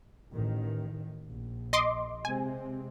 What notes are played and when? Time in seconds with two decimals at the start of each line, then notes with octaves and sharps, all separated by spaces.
0.33 A1 D#3
1.26 A#1
1.73 D#5 C6 D6
2.25 C3 G#3 C4 G#5